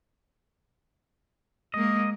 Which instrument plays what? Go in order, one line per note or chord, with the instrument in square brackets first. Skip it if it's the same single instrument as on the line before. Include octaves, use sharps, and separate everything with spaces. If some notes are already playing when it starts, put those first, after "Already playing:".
[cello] G#3 A#3 [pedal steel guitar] D#5